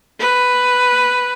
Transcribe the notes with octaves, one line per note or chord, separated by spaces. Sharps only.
B4